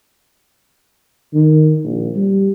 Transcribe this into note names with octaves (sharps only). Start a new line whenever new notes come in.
D#3
A#1
G3